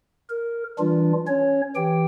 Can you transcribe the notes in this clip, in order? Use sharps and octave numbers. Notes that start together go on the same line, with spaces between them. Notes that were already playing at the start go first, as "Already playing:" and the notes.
A#4
E3 G3 D4 F4
C#4 C#5
E3 G4 G5